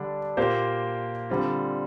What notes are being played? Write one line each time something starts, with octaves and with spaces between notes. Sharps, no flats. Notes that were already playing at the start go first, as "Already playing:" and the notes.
Already playing: D3 G3 D4
A#2 A#3 G4 C5
D3 G3 C4 F4